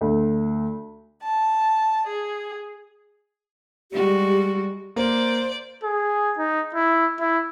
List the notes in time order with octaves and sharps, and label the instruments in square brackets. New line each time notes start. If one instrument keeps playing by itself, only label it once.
[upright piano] D2
[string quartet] A5
G#4
[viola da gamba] G3 G#3 F#4 [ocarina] G4
[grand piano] A#3 [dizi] C5 [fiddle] D5
[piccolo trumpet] G#4
D#4
E4
E4